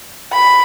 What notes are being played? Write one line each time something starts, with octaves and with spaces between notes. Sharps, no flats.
B5